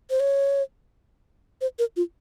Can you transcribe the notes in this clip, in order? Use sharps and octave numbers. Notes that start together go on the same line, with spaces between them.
C5
C#5
C5
A#4
F4